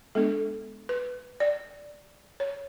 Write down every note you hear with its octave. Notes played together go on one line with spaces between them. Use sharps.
G#3 B3 D4 A4
B4
D5
C#5